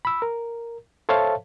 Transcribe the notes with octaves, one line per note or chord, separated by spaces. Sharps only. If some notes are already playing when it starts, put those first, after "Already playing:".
B5 E6
A#4
A4 C5 C#5 E5 F5 A5